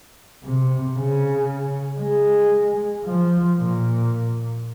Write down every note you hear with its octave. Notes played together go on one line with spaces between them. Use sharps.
C3
C#3
G#3
F3
A#2